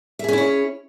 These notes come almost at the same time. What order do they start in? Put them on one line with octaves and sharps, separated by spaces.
E5 G#4 C#4 E4 C#5